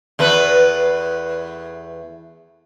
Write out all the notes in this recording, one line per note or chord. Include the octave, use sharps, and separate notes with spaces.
E2 A3 B4